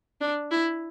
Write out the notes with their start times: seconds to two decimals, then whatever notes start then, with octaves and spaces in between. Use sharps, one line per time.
0.21 D4
0.51 E4